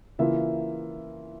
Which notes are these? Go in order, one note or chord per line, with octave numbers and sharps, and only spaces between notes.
C#3 E3 A#3 F4 E5